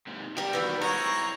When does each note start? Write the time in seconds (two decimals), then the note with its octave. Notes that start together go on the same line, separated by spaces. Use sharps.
0.07 G#2 C3
0.37 D#3 G3 G4 A#4
0.53 E3 B3 F#4
0.81 G#3 C4 E4 C#5 A#5